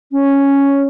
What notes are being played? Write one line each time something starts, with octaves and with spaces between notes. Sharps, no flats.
C#4